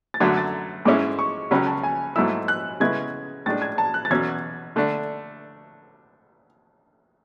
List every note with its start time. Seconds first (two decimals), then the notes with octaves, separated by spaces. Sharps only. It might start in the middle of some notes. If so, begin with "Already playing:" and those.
0.14 A6
0.20 F#2 D3 F#3 A3 G#6
0.37 A6
0.85 G#2 G#3 C#4 E4 D6
1.19 C#6
1.51 C#2 C#3 F#3 C#4 B5
1.67 A5
1.83 G#5
2.16 G#2 F#3 A3 E4 E6
2.48 F#6
2.80 C#3 G#3 B3 E4 G#6
3.46 A2 G#3 D4 A6
3.62 G#6
3.78 A5
3.94 F#6
4.05 A6
4.10 E2 B2 F#3 C#4 G#6
4.76 D3 A3 D4